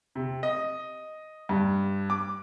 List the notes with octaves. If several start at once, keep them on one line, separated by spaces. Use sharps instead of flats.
C3
D#5
G2
D6